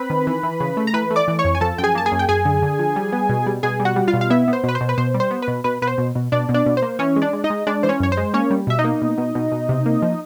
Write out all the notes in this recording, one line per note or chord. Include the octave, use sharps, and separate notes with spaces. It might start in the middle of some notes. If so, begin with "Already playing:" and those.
Already playing: C4 B4 B5
D#3
E3
E3
C#3
A3
A#5
E3 B4 B5
A3
D5 D6
E3
C#5 C#6
F2
G#5
F3 A4 A5
F#2 G5
G#4 G#5
A#3 A5
G#4 G#5
F#2
G5
F#2 G#4 G#5
D3
D3
F3
G3
B3
B2
G3
B2 G#4 G#5
G3
F#4 F#5
G3
F4 F5
B2
F5
B3 E4 E5
B3
C5
B2 B4
C5
B2
B4
B2 C5
G3
C5
B3
B4
B2
B2 B4
B2 B4
C5
B2
B2
B2 D4 D5
B2
D4 D5
B2
C5
A#3
E3 C#4 C#5
G#3
D4 D5
G#3
D#4 D#5
G#3
G#3 D4 D5
E3 C5
C#4 C#5
F#2 C#5
C5
G#3
A#3 C#4 C#5
G3
B2 E5
D#4 D#5
A#3
B2
B2
B2
B2
C3
A#3
F3